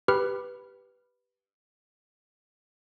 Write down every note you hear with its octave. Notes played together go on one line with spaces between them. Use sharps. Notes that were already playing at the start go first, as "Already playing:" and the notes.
G4 B4 B5 F6